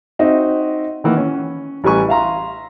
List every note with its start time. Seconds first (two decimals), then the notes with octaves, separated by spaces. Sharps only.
0.19 C4 D#4 F#4 D#5 E5
1.04 D#3 E3 A#3 F#5
1.17 C#4
1.84 A1 G3 B4 G#5 C#6
2.09 E5 F5 A#5 C6